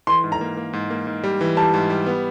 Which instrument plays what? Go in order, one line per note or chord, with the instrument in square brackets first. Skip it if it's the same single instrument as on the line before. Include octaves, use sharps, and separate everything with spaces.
[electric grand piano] E3 [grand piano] C6
[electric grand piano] G#2
[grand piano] A#5
[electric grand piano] A#3
A#3
G#2
A#3
G#2
G3
E3
[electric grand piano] G3 [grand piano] A5
[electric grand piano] G#2
G3
B3